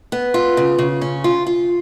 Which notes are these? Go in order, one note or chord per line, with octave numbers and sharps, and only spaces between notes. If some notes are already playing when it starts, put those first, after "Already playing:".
B3
F4
C#3
C#3
C#4
F4
F4